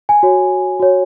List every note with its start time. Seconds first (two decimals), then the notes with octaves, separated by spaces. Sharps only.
0.09 G#5
0.23 F#4 C#5
0.80 F#4 C#5